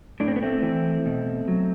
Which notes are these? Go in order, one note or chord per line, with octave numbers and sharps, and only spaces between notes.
A2 D4
C4
B3
A3 C4
E3
B2
F#3